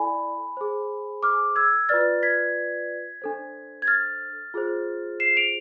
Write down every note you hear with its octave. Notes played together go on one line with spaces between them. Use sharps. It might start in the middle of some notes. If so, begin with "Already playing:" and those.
Already playing: E4 A4 D5 G#5 B5
G#4 C5
D6 F6
E6 G#6
F4 B4 D5 F6 A6
G#6 B6
D4 A4 C5
G#6
F6 A6
F4 G#4 C5
C7 E7
D7 F7